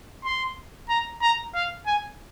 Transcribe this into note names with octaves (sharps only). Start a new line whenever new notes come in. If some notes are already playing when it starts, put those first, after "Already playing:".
C6
A#5
A#5
F5
G#5